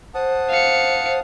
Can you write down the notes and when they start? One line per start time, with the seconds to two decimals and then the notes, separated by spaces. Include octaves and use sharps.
0.14 C5 F#5 A5 D#6
0.50 F5 C#7